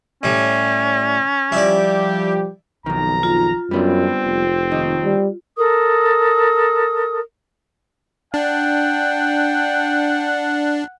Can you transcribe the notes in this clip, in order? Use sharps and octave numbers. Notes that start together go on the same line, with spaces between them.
A2 G3 C#4
F3 G3 E4 G4 D5
B1 F2 D#3 A#5
F4
F#2 G3 B3 C4 D4
F1
D#2 D#4
G3
A4 A#4 D#6
D4 F#5 G5